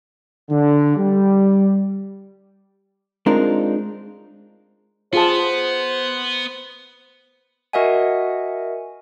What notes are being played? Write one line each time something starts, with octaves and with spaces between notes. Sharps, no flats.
D3
G3
G#3 C4 D4 D#4 F4 A#4
B3 F4 G#4 C5 A5
F#4 A#4 D#5 E5 F#5 G#5